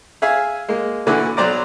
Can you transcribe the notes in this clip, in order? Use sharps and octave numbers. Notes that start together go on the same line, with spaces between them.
G#4 E5 F5 G#5
G#3 A#3
A#2 D3 E3 E4 F#4
B1 F#3 C5 D5 A#5 D6